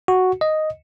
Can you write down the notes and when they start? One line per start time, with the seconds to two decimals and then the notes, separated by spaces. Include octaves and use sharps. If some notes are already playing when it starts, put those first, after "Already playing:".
0.08 F#4
0.41 D#5